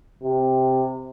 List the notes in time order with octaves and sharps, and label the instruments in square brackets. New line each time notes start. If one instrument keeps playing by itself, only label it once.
[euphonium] C3